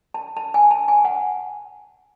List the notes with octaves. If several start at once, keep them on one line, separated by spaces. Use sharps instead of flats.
A5
A5
G#5
A5
G#5
F#5